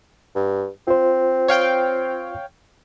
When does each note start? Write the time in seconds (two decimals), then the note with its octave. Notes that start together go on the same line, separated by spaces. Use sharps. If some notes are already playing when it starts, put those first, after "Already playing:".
0.36 G2
0.88 C4 F4 C5
1.48 C#5 F5 G5